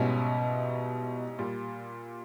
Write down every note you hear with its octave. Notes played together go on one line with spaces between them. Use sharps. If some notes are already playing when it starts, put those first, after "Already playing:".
Already playing: G#2 B2 G3 C#4 E4
A#2 G3